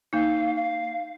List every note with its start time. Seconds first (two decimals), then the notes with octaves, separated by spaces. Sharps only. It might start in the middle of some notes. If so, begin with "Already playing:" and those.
0.13 A#3 D#4 F5
0.56 F5